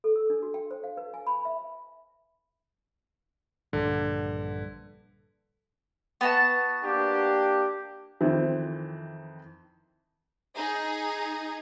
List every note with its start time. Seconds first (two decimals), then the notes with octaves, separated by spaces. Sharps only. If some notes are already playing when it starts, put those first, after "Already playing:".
0.04 A4
0.16 E6
0.30 D4
0.42 F#4
0.54 G5
0.71 C5
0.84 F5
0.97 B4
1.14 G#5
1.27 B5
1.45 E5
3.73 A#1 G2 D3
6.21 B3 F#4 A5
6.84 A#3 D4 G4
8.21 F2 D#3 E3 C4
10.56 D#4 G#4